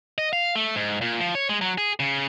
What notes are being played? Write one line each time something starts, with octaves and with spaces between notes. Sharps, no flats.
D#5
F5
A3
G#2
A#2
F3
C#5
G#3
F#3
G#4
C#3